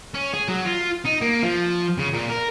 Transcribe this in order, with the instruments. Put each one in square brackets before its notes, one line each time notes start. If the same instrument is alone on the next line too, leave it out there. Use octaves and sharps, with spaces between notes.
[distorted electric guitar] C#4
G#4
F#3
F4
D#4
A#3
F3
C#3
A#2
A#4